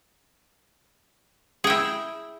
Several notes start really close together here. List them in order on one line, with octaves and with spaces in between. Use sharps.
G#4 G5 E4